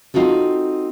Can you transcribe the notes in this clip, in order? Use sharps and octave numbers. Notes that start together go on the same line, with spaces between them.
C4 D#4 F4 F#4 A4